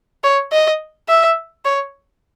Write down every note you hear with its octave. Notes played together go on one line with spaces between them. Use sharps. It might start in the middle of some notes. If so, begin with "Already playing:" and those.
C#5
D#5
E5
C#5